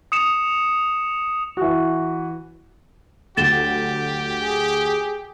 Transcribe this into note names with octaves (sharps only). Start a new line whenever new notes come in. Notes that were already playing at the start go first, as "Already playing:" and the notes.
D#6 C#7 E7
E3 F#4
D2 F#3 G4 A6 E7 G7
G#4